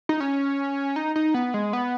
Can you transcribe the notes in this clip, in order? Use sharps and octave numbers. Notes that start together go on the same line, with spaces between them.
D#4
C#4
D#4
D#4
B3
G#3
B3